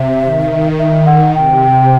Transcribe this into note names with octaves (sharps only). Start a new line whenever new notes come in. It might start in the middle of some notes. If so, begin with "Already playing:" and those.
Already playing: C3 E5
D#3
D#3 E5
F#5
C3 G5